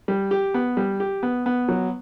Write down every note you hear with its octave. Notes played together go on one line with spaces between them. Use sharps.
G3
G4
B3
G3
G4
B3
B3
F#3